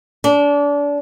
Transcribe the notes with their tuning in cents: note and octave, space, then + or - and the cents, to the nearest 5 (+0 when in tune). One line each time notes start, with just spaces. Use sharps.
D4 -30